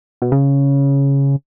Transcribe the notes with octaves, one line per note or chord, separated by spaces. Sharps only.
B2
C#3